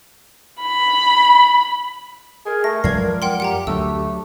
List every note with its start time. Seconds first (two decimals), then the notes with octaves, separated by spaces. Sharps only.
0.60 B5
2.46 G#4 A#4
2.64 A3 A#6
2.84 F#2 A#2 F3 G#3 B4 G#6 C7
3.22 F#5 G5 C6
3.40 G4 F#5 G5 A#5
3.67 D2 F#3 A3 E6